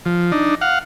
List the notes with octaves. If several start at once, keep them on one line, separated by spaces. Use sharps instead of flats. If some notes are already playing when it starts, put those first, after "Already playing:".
F3
D4 D#4
F5 F#5